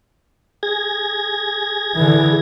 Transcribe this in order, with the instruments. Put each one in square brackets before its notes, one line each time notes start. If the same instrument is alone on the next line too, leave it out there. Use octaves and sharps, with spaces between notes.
[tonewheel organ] G#4 G#6 A#6
[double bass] D3 E3